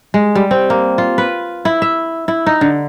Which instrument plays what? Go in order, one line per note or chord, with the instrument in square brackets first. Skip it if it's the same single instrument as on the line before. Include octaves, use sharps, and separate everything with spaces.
[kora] G#3
G3
C4
A#3
F4
B4
E4
E5
E4
D#4
D3